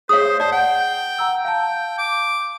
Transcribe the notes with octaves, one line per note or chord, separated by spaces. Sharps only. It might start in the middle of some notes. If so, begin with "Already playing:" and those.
G#4 C5 C#5 F5 D#6
C5 D5 A5
F#5 G5
F#5 A#5 E6
F5 G5 A5
D6